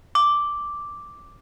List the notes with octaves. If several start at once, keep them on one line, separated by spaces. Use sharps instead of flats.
D6